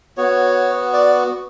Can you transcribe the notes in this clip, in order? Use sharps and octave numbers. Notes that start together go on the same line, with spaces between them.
B3 F#4 C#5
D5